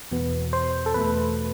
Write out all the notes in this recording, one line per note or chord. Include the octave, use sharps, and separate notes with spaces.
E2 B2 B3
C5
A4
E2 B2 A3 B4